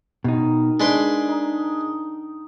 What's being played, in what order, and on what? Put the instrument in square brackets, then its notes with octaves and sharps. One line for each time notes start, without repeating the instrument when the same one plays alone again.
[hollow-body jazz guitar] B2 D#4 [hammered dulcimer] D#3
[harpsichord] G#3 B4 C6 [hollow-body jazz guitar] D4
[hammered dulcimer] D#4